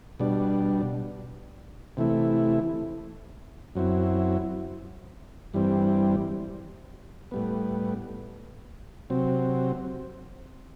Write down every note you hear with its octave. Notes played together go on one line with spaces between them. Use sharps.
B2 G3 D4
C3 E3 A3 E4
F#2 F#3 C4 E4
G2 E3 G3 C4
A2 G3 B3
C3 F#3 C4